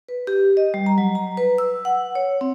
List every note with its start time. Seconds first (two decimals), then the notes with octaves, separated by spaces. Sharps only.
0.09 B4
0.27 G4
0.57 D#5
0.74 G3
0.86 A#5
0.98 F#3
1.15 A#5
1.37 B4
1.58 E6
1.85 F#5
2.15 C#5
2.41 C4